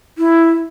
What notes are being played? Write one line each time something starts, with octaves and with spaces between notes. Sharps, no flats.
E4